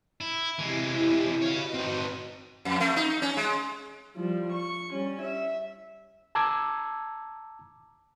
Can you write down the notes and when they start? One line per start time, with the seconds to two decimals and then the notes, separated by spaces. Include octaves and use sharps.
0.21 E4
0.59 C3 E3 G#3 E4 G4
1.42 F#4 B4 C#5 D#5 F5
1.74 C4 D#4
2.65 F2
2.80 A3
2.96 D#4
3.22 C#4
3.37 G#3
4.16 F3 G3
4.53 C#6
4.92 G3 C#4
5.22 E5
6.35 A5 A#5 D6 E6 G#6